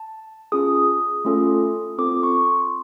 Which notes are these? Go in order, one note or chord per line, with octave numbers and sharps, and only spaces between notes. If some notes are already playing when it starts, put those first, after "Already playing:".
Already playing: A5
C#4 F4 G#4 D#6
A3 C#4 F4 A4
C4 F4 A4 D6
C#6
C6